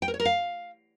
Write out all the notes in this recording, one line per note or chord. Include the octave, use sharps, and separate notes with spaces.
G5
A#4
C#5
A#4
F5